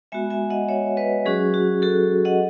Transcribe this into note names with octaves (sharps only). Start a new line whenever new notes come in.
G#3 B3 F#4 E5 G#5
E5 G#5
D#5 F#5
C#5 E5
B4 D#5
F#3 C#4 F#4 G#4
F#4
F#4 A4
D#5 F#5